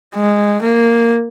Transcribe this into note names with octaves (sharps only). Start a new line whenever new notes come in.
G#3
A#3